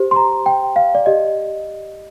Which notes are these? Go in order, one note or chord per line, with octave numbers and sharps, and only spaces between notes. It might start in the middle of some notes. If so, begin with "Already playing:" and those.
Already playing: G4 C5
C6
A#5
G5
F5
D5
G4 D5 D#5